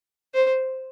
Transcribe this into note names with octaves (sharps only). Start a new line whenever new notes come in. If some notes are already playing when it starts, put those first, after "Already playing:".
C5